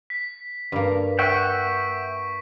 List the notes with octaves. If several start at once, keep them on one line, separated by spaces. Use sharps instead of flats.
B6
G2 A#3
E5 F#5 G5 C#6 B6 D7